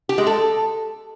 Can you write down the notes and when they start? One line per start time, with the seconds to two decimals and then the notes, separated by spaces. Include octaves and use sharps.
0.09 G4
0.18 G#3
0.27 A4